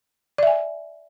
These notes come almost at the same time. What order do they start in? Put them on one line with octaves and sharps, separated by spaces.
D5 E5 G#5